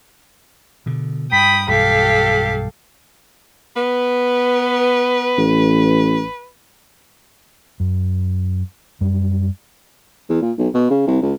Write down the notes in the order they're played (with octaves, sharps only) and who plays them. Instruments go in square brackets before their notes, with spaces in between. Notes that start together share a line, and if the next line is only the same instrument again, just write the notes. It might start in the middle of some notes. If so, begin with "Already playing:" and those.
[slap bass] B2 D3
[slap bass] G2 [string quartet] G5 B5 D#6 [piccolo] B6
[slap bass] B1 G2 [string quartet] G4 A4 F5 [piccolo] B6
[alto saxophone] B3 [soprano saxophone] B4
[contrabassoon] A1
[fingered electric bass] F#2
F#2 G3
[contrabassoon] E2
A#2
B1
B2
C#3
C2
C#2